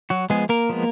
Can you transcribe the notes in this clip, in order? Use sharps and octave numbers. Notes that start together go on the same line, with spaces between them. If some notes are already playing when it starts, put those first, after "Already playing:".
F#3 F#4
F3 G#3 B3 G#4
A#3 A#4
F3 G#3 B3